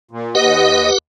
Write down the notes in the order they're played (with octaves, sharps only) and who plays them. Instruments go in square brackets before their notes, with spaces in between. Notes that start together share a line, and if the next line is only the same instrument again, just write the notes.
[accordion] A#2
[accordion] D#2 D#5 D#6 [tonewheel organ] G4 B4 F#5